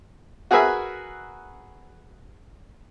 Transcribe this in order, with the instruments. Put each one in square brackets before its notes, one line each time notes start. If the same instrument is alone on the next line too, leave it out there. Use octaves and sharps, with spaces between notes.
[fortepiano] F#4 G#4 A#4 B4 E5 G#5